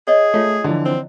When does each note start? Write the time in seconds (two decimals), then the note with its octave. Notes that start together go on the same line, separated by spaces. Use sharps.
0.08 G#4 C#5 D#5
0.34 A3 F4 C#5
0.64 D3 E3 F3 E4
0.85 C4